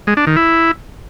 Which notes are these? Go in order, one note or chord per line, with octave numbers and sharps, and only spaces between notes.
G#3
D4
D#3
E4